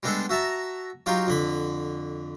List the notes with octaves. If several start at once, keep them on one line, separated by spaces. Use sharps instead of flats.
G3 G#3 B3 D4 A4
F#4 E5 A5 A#5
F#3 D#4 F4 G4
F2 D3 B5